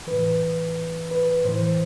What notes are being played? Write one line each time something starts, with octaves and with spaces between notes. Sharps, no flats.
A2 E3 B4
B4
A2 E3 C5